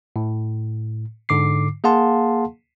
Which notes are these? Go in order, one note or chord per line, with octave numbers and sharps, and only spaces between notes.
A2
G#2 D3 D6 C7
A#3 G#4 F5 F#5 A5 C6